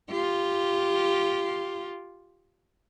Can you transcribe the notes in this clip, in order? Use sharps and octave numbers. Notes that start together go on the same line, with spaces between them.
F4 G4